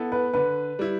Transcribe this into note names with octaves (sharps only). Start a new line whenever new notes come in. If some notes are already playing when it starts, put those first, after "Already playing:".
Already playing: B3 E4 A4
B4
D3 B4
G3 E4